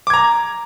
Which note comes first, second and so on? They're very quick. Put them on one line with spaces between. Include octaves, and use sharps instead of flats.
D6 G#6 A#5